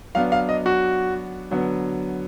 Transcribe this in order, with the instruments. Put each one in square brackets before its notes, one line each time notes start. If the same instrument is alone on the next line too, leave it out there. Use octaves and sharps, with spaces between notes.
[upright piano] F#3 B3 D4 [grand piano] F5
[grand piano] F5
D#5
F#4
[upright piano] D3 F#3 B3